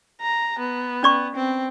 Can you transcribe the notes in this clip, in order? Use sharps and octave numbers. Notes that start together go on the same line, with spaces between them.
A#5
B3
C#4 D5 C#6
C4